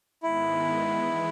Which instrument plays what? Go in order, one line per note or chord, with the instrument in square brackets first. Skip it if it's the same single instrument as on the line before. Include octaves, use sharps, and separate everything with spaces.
[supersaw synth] G#2 D#3 G#3 B3 [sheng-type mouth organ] E4
[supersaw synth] E3 G#3 B3